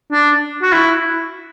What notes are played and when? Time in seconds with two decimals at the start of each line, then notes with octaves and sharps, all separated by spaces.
0.12 D4
0.62 F#4
0.72 E4